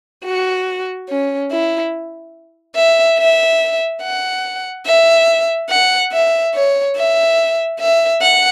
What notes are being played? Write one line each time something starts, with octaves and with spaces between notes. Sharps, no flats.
F#4
C#4
E4
E5
E5
F#5
E5
F#5
E5
C#5
E5
E5
F#5